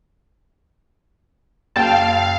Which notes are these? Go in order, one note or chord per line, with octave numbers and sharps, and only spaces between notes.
F#1 F5 G5 A5